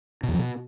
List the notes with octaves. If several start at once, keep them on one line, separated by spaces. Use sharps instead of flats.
B2
E2
F3
B2